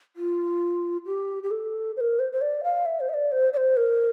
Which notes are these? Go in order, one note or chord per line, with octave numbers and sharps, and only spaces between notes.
F4
G4
G4
A4
C5
A#4
C5
C5
D5
F5
E5
C5
E5
D5
C5
D5
C5
A#4